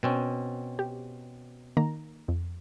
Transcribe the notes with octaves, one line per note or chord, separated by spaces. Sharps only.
B2 C4 C#4
G4
D#3 A#3 A#5
F2